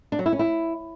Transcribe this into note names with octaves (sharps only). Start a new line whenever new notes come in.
D4
F#3
E4
C#4
E4